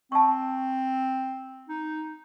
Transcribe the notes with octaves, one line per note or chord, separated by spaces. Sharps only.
C4 A5 C#6
D#4